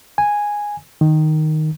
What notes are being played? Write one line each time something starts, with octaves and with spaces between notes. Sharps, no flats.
G#5
D#3